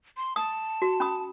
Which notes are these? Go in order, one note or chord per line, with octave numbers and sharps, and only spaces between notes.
C6
A5 D#6
F#4
C#4 B5 D#6